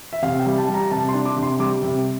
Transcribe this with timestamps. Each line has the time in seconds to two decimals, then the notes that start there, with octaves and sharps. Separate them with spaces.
0.13 E5
0.22 C3 F5
0.39 G5
0.46 G3
0.58 A5
0.68 G3
0.74 A#5
0.91 C3 A5
1.09 C6
1.14 D4
1.25 D6
1.36 C3
1.43 C6
1.59 G3 D6
1.82 C3